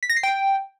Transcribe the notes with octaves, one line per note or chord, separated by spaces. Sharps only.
B6
A#6
C7
G5